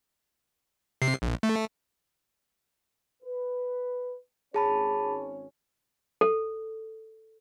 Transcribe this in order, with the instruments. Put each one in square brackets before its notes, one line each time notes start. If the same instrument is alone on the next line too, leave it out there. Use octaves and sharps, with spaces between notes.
[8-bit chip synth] C3 C7
A#1
A3
[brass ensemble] B4
[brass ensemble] G#1 C#4 C#5 [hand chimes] G#4 A5 B5
[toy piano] A4